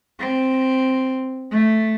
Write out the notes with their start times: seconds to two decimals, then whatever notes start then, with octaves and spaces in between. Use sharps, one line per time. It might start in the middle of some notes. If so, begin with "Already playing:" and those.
0.19 C4
1.51 A3